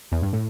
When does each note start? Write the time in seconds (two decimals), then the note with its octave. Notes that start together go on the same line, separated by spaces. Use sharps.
0.12 E2
0.22 G2
0.33 A2